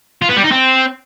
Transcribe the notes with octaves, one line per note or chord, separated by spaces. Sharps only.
F4
B3
G3
D#4
C4